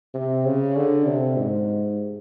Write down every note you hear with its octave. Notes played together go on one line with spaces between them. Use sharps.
C3
C#3
D3
C3
G#2